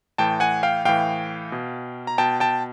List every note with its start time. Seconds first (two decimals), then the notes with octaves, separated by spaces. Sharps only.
0.18 A2 E3 G5 A5
0.40 F#5 G#5
0.63 F5 G5
0.85 A2 E3 F5 G5
1.52 B2
2.07 A#5
2.18 B2 G5 A5
2.40 G5 A5